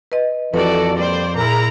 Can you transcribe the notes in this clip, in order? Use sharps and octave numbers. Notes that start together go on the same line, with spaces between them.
B4 D#5
F2 E3 F#4 A4 B4 D5
A#2 G3 C5 D5
A#2 E4 G#4 A#4 A#5